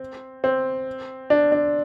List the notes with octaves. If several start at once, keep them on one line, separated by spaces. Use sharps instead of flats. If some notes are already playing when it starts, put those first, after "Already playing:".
Already playing: C4
C4
D4
D4